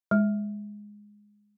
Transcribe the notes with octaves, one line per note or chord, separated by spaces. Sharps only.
G#3